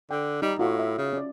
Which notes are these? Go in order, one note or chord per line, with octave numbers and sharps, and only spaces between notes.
D3 G5
G3 D#4
A2 F4 F#4
E5
C#3
C#4 D5